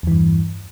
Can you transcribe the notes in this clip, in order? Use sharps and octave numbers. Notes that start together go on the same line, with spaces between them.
E2 G2 E3